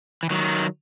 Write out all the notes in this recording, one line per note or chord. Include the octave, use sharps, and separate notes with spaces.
E3
D#3 F#3